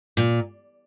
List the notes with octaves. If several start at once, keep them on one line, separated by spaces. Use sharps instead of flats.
A#2